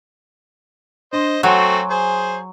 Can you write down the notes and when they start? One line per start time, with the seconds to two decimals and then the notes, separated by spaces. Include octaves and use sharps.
1.13 D4 C5 D#5 C6
1.43 F#3 A3 C4 F#4 C#5 G#5 C6
1.91 G#4 C5